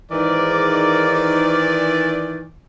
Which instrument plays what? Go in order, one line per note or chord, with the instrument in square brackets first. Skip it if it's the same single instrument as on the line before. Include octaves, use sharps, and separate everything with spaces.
[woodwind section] G#2 A#4 D6 [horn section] D#3 E3 D5